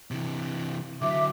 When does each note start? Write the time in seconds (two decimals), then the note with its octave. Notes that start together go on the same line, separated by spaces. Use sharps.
0.11 C3 E3
1.02 D3 F#3 E5 D6